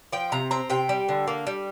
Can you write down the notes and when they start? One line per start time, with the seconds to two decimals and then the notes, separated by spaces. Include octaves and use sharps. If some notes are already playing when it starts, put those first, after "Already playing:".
0.12 F3 G5
0.32 C3 A#5
0.51 C4 A#5
0.70 C3 G5
0.89 G3
1.09 D3
1.27 A#3
1.47 G3